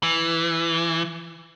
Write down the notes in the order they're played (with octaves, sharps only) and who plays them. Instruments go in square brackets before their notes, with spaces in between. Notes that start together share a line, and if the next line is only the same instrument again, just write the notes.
[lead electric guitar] E3